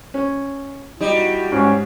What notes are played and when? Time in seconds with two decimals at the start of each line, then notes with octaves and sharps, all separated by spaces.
0.14 C#4
1.01 G3 D#4 E4 F#4
1.52 G#2 C#4